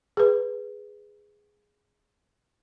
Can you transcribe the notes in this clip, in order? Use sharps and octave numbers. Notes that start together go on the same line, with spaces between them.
G#4 B4